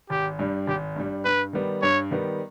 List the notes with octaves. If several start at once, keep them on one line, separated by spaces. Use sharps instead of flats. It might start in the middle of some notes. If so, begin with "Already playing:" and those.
G#1 G4
G2 G3
G#1 G4
G2 G3
G2 B4
D#3 G3 B3
G2 C#5
D#3 G3 B3